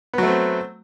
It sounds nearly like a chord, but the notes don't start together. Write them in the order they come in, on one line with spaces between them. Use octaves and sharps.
B3 F#3 A3 C4